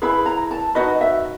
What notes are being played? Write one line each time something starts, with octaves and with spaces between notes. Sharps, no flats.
E4 G#4 B4 B5
A#5
A5
D#4 F#4 B4 D#5
E5